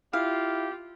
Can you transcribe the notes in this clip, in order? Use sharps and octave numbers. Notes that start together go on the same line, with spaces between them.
E4 F4 G4 F5